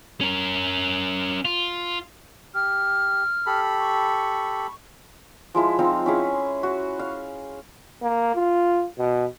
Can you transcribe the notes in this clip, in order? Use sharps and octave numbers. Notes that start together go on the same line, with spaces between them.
C#4 A#4
F4
G4 F6
G4 A4 B5
C#6
F3 G#3 E4
F3 C4 D#4 F5
C#4 E4 G#4
F#4
F5
A#3
F4
B2